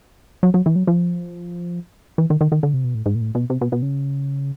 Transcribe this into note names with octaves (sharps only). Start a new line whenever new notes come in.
F#3
F#3
E3
F#3
F3
E3
D#3
D#3
D#3
D3
C3
B2
A2
G#2
A#2
A2
B2
C3
B2
B2
C#3